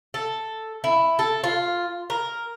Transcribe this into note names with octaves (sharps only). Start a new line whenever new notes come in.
A4
E4
A4
F4
A#4